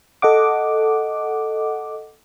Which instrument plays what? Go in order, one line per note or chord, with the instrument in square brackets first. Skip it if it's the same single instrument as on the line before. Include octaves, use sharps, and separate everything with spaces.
[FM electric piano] A4 D#5 F#5 D6